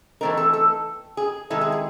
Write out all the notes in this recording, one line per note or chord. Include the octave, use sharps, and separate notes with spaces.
E3 A3 C4 D#4 A#4
A4
A4
G#4
C3 D#3 G#3 E4 A4
G#4
G#4